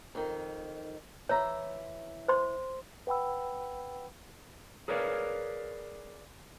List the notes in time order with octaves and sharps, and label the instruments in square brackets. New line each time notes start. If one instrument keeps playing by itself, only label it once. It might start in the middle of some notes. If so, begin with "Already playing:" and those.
[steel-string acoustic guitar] F2 D#3
[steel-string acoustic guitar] E3 E5 A#5 [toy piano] C#5
[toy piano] C5 C6
[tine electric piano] B4 F#5 G5 B5 E6
[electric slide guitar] G#4 A#4 B4 C#5 D5 F5